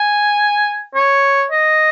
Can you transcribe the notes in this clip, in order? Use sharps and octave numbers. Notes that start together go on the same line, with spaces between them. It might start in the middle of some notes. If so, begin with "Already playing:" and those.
Already playing: G#5
C#5
D#5